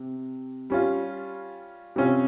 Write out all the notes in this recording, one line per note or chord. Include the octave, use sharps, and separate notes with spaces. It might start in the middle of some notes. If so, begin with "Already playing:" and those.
Already playing: C3
G3 C#4 F4
C3 G3 C#4 F4